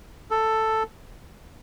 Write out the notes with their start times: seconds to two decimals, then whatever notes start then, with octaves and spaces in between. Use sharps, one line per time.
0.31 A4